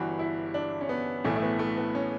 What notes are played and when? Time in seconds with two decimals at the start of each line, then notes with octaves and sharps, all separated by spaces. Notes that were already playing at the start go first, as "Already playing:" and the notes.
Already playing: G1 G2 E3 F#4
0.19 E4
0.54 D4
0.81 C#4
0.89 B3
1.24 B1 A2 E3 A3
1.36 A3
1.42 B3
1.59 A3
1.77 B3
1.95 C#4